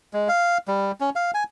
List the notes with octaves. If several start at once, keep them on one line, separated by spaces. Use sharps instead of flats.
G#3
F5
G3
C#4
F5
G#5